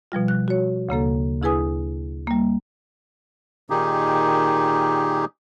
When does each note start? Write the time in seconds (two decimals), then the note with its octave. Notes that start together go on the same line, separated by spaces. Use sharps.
0.12 B2 F3 G3 F4
0.28 F#6
0.48 F#4 C#5
0.89 D2 C#3 A#3 A4
1.42 D2 E4 G#4 B4 G#5 D#6
2.27 G3 A#3
3.70 A#2 D#3 D#4 G4 G#4